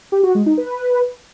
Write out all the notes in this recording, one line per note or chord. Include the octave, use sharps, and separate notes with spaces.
G4
F#4
G#3
D#4
B4